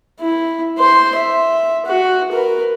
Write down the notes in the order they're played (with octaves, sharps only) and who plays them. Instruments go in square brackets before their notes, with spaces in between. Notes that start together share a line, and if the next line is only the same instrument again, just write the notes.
[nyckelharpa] E4
C5 C6
E5
F#4
A#4 B4